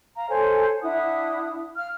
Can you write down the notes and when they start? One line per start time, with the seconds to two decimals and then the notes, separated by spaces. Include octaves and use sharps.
0.16 F5 A#5
0.29 A4 C5 C#5 G#5
0.82 D4 E4 F#5 D#6
1.77 F5 F6